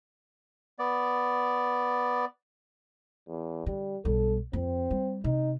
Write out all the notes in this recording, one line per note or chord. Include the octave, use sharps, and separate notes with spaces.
B3 D5
E2
D3 G3
B1 G3 A4
F2 C4
G3
C3 D#4